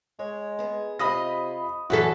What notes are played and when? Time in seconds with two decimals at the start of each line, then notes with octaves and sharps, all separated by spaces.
0.19 G#3 C#5
0.59 B3 G#4
0.99 C3 F4 D#5 B5 D#6 A#6
1.90 F#2 E3 C#4 E4 F#4 A4 B6